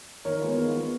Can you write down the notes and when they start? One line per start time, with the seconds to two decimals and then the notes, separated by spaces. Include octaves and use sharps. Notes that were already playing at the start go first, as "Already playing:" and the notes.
0.25 D#3 A#4 C#5
0.41 G#3 B3 F4
0.57 D#3
0.74 G#3 B3 F4